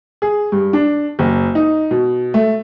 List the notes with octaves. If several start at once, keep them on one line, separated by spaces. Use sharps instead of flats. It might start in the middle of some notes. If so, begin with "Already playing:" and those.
G#4
G2
D4
F#1
D#4
B2
A3